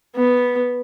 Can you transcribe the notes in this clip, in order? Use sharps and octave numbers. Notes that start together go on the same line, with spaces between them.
B3